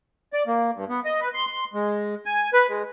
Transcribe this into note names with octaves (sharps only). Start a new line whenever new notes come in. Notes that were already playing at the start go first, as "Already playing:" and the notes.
D5
A#3
G2
B3
D#5
B4
C6
C6
G#3
G#5
B4
G#3